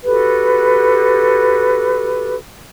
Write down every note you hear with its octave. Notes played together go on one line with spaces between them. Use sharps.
F#4 G4 A4 B4